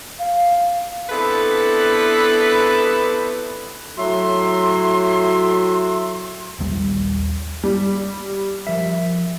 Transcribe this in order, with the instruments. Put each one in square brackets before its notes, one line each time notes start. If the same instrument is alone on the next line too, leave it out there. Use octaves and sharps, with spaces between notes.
[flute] F5
[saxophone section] B3 C4 D4 E4 A4 B4
[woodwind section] A2 F#3 F#4 E5 C6
[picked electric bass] A#1 D#2 G3
[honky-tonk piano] G3
[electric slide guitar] F3 A#4 E5